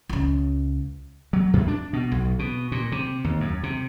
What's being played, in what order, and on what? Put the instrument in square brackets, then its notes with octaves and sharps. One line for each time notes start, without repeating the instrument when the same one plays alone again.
[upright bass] C#2 C#3
[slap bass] F#3
F#2
D4
B2
B1
B2
A#2
C3
D#2
F#2
C3